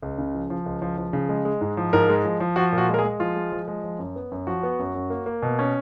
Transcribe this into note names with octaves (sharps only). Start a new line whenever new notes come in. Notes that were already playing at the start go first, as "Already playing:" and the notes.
C#2
C#3
F3
F3
C#2
F3
F3
C#3
G#3
G#3
G#2
F3
G#2 A#4
G#3
F3
F3
F3 F#4
A#2
F#4
G#3
A#4
G#4
G#3
F3 F4
G#3
F3
G#3
F3
F#2
B3
F#2
F3 F#4
B3
F#2
F#2
A#3
A#3
B2
C#4